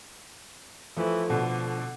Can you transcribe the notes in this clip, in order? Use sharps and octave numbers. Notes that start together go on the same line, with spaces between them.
E3 F3 A3
B2 D3